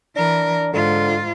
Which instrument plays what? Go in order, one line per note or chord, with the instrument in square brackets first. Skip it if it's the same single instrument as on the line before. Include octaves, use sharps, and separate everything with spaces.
[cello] E3 A#4 [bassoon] D4
[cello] G#2 F4 [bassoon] D3